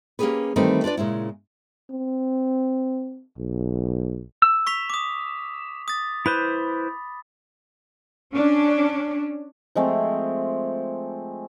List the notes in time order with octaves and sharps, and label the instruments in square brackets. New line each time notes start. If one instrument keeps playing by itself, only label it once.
[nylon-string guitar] A#3 C#4 D4 G4 G#4 B4
D#3 E3 G3 A3 C4 D#4
D4 F4 B4 D5
A#2 C#3 G#3 E4
[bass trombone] C4
B1
[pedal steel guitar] E6
[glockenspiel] C#6 B6 F7
D6 D#6
D#6 A6
[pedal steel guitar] E4 B4 C5 [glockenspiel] B5
[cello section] C#4 D4
[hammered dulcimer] F3 G#3 A3 C4